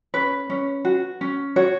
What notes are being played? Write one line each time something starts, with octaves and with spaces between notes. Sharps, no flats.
C#4 B4
C#4
F#4
C#4
F#4 C#5